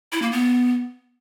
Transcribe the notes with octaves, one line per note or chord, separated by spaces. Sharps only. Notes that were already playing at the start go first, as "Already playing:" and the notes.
E4
A#3
B3